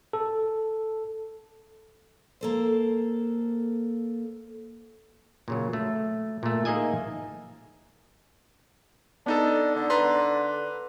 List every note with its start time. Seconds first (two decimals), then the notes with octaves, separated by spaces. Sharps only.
0.13 A4
2.41 A#3 A4 C5
5.48 A#2 C#3 F#3
5.73 A3
6.43 A#2 A3
6.65 A#3 D#4 G#4 D#5 E5 G#5
9.26 B3 D4 D#4 A4
9.76 D3
9.90 B4 A#5 C6